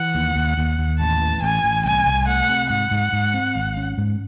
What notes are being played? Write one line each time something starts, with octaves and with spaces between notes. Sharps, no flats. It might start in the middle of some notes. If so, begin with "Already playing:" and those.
Already playing: E3 F#5
D#2
D#2
D#2
D#2
A1 A5
E3
A1 G#5
A1
C2 G#5
C2
A3 F#5
C3
G#2 F#5
G#2
G#2
C4
G#1
C#4
G#2